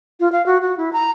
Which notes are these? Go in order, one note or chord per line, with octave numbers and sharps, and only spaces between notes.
F4
F5
F#4
F#4
E4
A#5